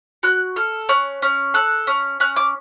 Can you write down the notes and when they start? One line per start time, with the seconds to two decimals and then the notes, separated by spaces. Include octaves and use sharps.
0.23 F#4 F#6
0.56 A4 F6
0.89 C#4 F#6
1.22 C#4
1.54 A4 F#6
1.87 C#4
2.20 C#4 F#6
2.36 D6